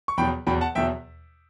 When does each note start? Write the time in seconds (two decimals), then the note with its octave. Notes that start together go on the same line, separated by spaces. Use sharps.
0.08 C#6
0.17 E2 B2 F#3 G5 B5
0.47 E2 B2 F#3 G5 B5
0.61 F#5 A5
0.75 E2 B2 F#3 E5 G5